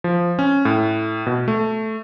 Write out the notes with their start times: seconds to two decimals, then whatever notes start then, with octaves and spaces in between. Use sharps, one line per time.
0.04 F3
0.39 C#4
0.65 A2
1.27 B2
1.48 A3